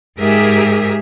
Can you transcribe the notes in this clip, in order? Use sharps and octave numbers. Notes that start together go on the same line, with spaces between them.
G#2 G4 G#4 A#4 E5